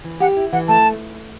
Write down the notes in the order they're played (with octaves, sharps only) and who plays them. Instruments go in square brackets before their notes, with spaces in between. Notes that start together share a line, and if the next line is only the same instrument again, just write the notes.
[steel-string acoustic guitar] E3
[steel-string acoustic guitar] G4 [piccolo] F#5
[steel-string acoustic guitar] E4
[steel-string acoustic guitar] E3 [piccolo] F#5
[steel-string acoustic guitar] A3 [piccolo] A5